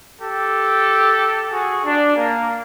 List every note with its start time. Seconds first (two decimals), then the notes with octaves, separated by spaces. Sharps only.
0.22 G4 A4
1.52 F#4 G#4
1.85 D4
2.17 A#3